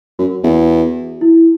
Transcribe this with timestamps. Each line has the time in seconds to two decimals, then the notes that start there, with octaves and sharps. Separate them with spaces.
0.19 F#2 F#4
0.44 E2
1.21 E4